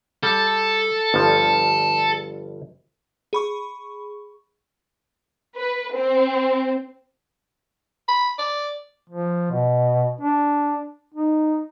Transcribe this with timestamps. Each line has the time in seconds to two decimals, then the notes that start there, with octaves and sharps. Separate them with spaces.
0.23 G3 A4
1.14 G1 G2 F3
3.33 G#4 B5 C#6
5.56 B4
5.96 C4
8.08 B5
8.38 D5
9.09 F3
9.51 B2
10.21 D4
11.14 D#4